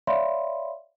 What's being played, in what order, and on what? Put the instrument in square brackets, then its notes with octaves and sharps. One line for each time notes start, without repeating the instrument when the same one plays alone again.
[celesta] C#5 D5 E5 F5 B5 C6